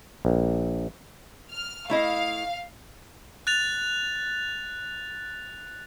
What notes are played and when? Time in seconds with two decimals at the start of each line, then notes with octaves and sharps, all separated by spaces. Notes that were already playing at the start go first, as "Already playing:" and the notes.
0.25 A#1
1.52 F6
1.90 A3 E4 D#5 F5
3.47 F#6 A6 F7